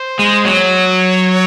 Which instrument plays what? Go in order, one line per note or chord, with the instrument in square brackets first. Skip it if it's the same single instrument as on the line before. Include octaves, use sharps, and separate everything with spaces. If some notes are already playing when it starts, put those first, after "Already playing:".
Already playing: [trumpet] C5
[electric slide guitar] G#3
[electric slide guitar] F#3 [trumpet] C#5